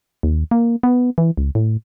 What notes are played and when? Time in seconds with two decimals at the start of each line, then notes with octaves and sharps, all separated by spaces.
0.23 D#2
0.51 A#3
0.83 B3
1.18 E3
1.37 C#2
1.55 A2